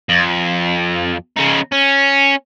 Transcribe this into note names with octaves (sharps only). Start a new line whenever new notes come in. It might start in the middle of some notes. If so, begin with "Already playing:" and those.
F2
C#3 D#4
C#4